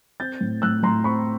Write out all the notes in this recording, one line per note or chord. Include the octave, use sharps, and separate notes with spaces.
C4 G6 A6
A2
A2 E6 F#6
A2 A#5 C6
C4 B5 C#6